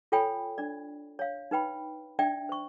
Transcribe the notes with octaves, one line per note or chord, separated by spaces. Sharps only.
F4 A4 C#5 G5 G#5 B5
D4 D5
C#5 F5
D#4 B4 G5 B5
D4 D5 E5 G5
C5 C#6